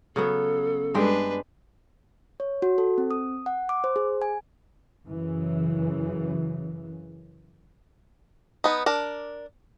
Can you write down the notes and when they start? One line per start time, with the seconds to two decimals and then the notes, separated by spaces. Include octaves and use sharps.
0.16 C#3 F#3 B3 A4
0.94 G2 G#3 D4 B4 G5
2.40 C#5
2.62 F#4
2.78 A4
2.98 C4
3.11 D#6
3.46 F#5
3.69 D6
3.84 C5
3.96 G#4
4.22 G#5
5.07 F#2 C#3 E3
8.64 B3 D#4
8.86 D4 A#4